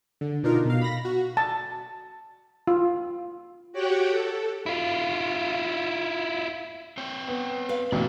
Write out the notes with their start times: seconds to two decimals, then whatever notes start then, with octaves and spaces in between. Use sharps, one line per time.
0.21 D3
0.43 B2 D4 D#4 F4 A#4
0.65 B2 F5
0.81 B5 A#6
1.05 F#4
1.37 A5
2.67 F4
3.73 F#4 G4 C#5 F#5 G5
4.09 A4
4.66 E4 F4
6.97 C4 C#5 G5
7.28 B3
7.69 B4 F5
7.92 A1 B2 A#3 D#4 D5